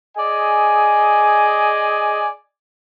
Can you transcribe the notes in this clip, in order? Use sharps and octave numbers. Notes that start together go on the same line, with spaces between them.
G#4 D5 D#5 G#5